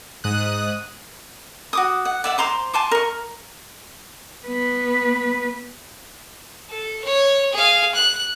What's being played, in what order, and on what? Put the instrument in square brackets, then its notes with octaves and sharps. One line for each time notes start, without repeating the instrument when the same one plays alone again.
[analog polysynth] G#2 D#6 F#6
[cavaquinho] F#4 D6 D#6
F#5
D5 E5 F#5
C5 A#5 C6 D6
G#5 A5 C6 D6
A#4 C#6
[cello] B3 B4
[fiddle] A4
C#5
G#4 F5
F#6